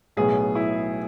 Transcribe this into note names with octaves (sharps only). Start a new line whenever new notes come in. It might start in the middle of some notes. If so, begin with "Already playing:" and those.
B1 A2 F#3 B3 G#4
E4